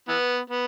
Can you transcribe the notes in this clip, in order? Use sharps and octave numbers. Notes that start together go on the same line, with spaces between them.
E3 B3
B3